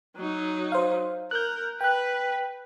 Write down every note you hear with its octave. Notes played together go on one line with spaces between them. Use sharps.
F#3 D#4
C5 F5
A#4 F#6 G6
B4 G5 F#6